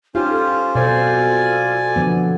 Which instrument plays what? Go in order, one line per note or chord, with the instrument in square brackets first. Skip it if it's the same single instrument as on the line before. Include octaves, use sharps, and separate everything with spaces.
[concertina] C#4 C5 [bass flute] D#4 [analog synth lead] F4 [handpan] G4
[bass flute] A4
[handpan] B2 C5 [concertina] D5 G#5
[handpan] D3 F3 B3